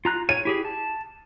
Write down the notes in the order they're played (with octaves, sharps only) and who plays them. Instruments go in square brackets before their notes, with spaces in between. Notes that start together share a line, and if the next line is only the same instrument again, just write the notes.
[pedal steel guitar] F4 A#5 F#6
[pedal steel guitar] C#5 [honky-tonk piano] D#7
[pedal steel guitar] E4 G4 G#4
A5